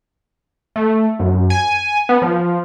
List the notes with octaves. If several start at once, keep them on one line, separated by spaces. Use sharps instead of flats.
A3
F#2
G#5
B3
F3